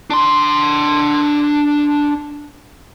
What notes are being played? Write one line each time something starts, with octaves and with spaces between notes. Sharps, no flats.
D4 C6